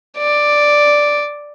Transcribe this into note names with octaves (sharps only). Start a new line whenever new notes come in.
D5